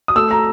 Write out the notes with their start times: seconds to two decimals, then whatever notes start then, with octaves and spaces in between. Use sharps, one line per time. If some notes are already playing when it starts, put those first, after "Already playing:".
0.08 D#6
0.16 A3 E6
0.31 A#5